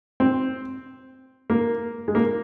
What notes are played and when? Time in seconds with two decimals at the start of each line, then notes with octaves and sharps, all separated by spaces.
0.20 C4
1.50 A#3
2.08 G#3
2.15 A#3